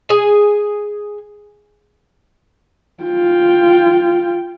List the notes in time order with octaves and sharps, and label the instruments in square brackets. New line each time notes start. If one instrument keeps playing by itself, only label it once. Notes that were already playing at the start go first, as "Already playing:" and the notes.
[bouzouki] G#4 G#5
[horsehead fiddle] F4 G5